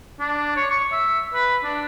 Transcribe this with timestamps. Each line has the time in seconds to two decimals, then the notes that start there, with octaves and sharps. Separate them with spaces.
0.20 D4
0.56 C#5
0.70 C#6
0.92 E5
1.34 B4
1.63 D4